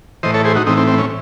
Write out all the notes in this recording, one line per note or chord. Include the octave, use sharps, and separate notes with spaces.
A2 E3 C5 D#5
A4 C#5
G#4 C5
D#4 F#4
A2 E3 C4 D#4
C4
C4
C#4